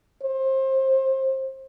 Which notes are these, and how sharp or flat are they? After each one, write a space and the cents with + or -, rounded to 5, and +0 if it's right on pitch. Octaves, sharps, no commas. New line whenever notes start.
C5 +25